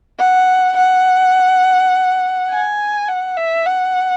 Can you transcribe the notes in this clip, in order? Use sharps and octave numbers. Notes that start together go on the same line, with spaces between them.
F#5
F#5
G#5
F#5
E5
F#5